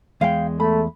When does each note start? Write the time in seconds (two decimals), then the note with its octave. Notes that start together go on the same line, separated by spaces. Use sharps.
0.21 E2 G#3 F5 G5
0.60 A3 B5